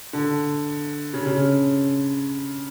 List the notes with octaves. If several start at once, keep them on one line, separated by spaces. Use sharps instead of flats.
D3
C#3
C#3